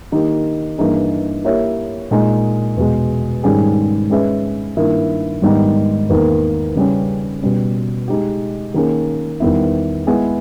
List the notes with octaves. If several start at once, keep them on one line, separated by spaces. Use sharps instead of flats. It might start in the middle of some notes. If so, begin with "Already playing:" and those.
D#3 A#3 D#4 G4
G2 E3 A#3 D#4 G#4
A#3 E4 G4 C#5 E5
A#2 G#3 D#4 A#4
E2 B2 G#3
G#2 D#3 G3 C#4 G#4
G#3 C#4 G#4 B4 E5
G2 D#3 A#3 E4 A#4
G#2 D#3 G3 B3 D#4
E2 D#3 A#3
C#3 G3 C#4
B2 G3 C#4
G#3 D#4 G4
D#3 A#3 C#4 G#4
E2 D#3 G3 B3 E4
G#3 B3 E4 G#4